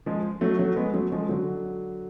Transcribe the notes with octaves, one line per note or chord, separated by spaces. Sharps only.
F3 G#3
F#3 A3
F#3 A3
G#3 B3
F#3 A3
F3 G#3
D3 F#3